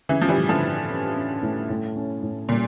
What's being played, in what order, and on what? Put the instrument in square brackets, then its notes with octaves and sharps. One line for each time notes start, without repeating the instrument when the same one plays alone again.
[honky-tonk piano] C#3 E3 [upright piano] C#4
[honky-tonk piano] F3
E3 G3
[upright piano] A2
[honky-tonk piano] D3 F3
[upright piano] A2
C#4
C#4
A2
A2
C#4
A2
[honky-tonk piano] A#2 [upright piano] G3